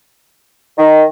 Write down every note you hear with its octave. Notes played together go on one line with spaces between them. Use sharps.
D#3